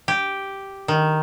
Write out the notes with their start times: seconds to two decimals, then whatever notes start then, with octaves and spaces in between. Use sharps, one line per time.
0.08 G4
0.88 D#3